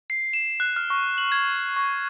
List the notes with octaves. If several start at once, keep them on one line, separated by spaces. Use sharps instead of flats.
C7
E7
F#6
F6
C#6
F#7
G#6
C#6